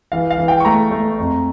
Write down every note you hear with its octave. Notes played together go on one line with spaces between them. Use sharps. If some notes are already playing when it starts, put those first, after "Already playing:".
E3 F5
F5
E3
G5
C#6
A3 A#5
A3
F2